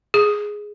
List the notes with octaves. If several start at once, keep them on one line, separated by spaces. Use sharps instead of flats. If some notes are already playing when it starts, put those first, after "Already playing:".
G#4